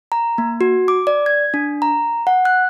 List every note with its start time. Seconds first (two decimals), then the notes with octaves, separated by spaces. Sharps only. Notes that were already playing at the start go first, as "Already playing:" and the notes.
0.12 A#5
0.38 A#3
0.61 F#4
0.88 D6
1.07 D5
1.26 G#6
1.54 D4
1.82 A#5
2.27 F#5
2.45 F#6